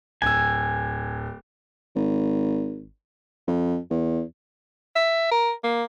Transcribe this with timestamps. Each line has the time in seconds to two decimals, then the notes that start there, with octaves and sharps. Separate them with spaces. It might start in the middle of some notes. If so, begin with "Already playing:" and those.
0.22 D1 G#5 E6
1.95 G#1
3.47 F2
3.90 E2
4.96 E5
5.31 A#4
5.64 A#3